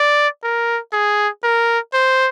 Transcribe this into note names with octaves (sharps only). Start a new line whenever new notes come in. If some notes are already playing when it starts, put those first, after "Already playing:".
Already playing: D5
A#4
G#4
A#4
C5